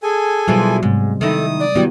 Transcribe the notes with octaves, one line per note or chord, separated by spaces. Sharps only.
G#4 A4 G#5
B2 E3 F#3 G3 F4 C5
G#2 C3 G#3 B3
D#3 D#4 E4 A4 D#6
D5
D#3 F#3 G3 B3 E4 G4